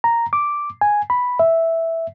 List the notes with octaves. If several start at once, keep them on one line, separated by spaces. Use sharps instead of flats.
A#5
D6
G#5
B5
E5